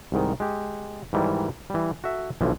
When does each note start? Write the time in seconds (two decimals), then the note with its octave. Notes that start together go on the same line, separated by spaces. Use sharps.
0.12 C2 G#2 D#3
0.40 G#3 G4
1.13 G#2 D#3 E3 G3
1.70 E3 G3
2.04 F#4 A4 E5
2.41 B1 D3 E3 F3